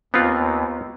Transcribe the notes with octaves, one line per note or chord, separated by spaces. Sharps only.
D#2 B3 C4 F4